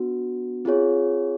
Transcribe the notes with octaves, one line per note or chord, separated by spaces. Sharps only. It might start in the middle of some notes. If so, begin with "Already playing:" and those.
Already playing: B3 D4 F#4
C4 F4 G#4 C#5